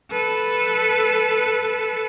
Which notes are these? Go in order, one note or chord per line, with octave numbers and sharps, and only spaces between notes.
A4 B4